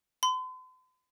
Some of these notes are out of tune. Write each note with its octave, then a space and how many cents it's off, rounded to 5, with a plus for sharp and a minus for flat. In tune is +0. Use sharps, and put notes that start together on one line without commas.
C6 -45